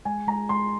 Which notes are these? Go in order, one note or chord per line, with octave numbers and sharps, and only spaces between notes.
G#3 G#5
G#3 A#5
G#3 C6